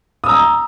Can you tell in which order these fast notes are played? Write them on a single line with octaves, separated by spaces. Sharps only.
D#6 E6 A#5